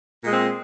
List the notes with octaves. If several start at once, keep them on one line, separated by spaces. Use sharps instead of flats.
A#2 G#3 C4